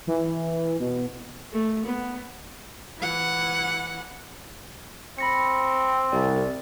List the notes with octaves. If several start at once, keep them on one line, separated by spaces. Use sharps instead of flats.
E3
B2
A3
B3
E3 F#5
C4 B5 A#6 C#7
C2 D5